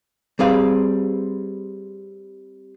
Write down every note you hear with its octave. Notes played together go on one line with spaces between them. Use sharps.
G3 C4 G#4 B4 F5